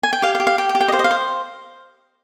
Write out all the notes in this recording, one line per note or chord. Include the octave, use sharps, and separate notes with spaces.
G#5
G5
G4 F5
F5
G4
F5
G4 G5
G5
G4
G5
D#5
C5 F5
D#5
F5
C5